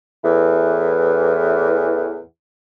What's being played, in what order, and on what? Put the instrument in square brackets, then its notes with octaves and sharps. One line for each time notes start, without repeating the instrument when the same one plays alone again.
[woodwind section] E2 A2 E3